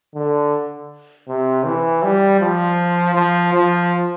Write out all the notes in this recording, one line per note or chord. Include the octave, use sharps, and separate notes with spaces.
D3
C3
E3
G3
F3
F3
F3